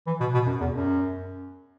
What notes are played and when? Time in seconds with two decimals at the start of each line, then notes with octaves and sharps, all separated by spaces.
0.07 E3
0.20 B2
0.34 B2
0.47 F#2
0.61 E2
0.75 F#2